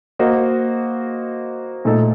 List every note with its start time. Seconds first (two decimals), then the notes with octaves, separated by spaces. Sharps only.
0.19 A#3 F#4 C5 D#5
1.85 A#2 A3 D#4 A4 D#5